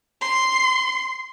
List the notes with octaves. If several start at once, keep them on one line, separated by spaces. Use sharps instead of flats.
C6